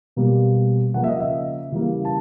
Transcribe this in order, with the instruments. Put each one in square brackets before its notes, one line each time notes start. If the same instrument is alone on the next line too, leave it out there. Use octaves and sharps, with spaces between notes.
[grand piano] B2 G3 A#3
C#3 F3 A#3 F#5
E5
D#5
E5
C#3 E3 G3 A#3
A5